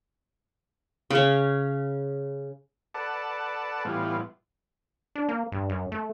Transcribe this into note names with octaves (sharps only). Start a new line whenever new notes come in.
C#3 C#4
A4 B4 D5 F#5 A5
A2 E3 G3 B3 F4
D4
A#3
G2
F#2
A3